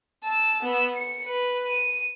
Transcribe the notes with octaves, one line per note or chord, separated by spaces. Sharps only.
A5 E6
B3 E6
C#7
B4
D#7